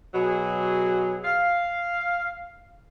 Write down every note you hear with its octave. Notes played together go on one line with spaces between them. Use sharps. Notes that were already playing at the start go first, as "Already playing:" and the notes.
B2 F#3 G#4
F5